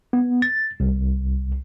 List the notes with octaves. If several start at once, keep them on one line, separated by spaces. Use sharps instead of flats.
B3
A6
C2